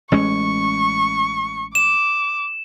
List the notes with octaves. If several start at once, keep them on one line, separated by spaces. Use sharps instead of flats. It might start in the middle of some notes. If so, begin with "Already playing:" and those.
A1 G#3 C#4 C#6
D6 E7